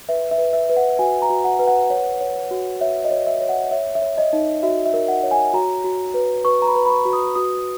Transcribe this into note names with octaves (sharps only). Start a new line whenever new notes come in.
B4 E5
E5
B4
E5
B4
F#5
F#4 G#5
A#5
F#4
F#5
B4
F#5
C#5
C#5
F#4
C#5 E5
D#5
C#5
E5
C#5
F#5
C#5 E5
E5
C#5
D#5
D#4
F#4 E5
E5
A#4
F#5
C#5
G#5
F#4 A#5
F#4
B4
B4 C#6
A#5
B5
B4
B5
C#6
F#4
D#6
F#4 D#6